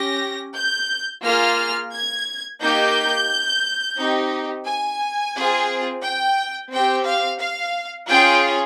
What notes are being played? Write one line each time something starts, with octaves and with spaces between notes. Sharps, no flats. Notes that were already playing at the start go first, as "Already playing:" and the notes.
Already playing: C#4 G4 A#6
G6
A#3 F4 G#4 F6
G#6
A#3 D#4 G4 G6
C4 D#4 G4
G#5
C4 F4 G#4
G5
C4 G4 G5
F5
F5
C#4 F4 G#4 G5